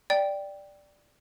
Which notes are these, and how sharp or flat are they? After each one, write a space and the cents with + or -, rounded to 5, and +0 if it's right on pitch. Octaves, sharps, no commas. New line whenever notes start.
D5 +0 G5 +0